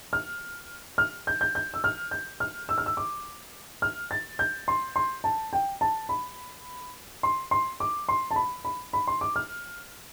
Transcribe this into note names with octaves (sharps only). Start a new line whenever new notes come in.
F6
F6
G6
G6
G6
E6
F6
G6
F6
E6
F6
E6
D6
F6
A6
G6
C6
C6
A5
G5
A5
B5
C6
C6
D6
C6
A5
B5
B5
B5
C6
D6
F6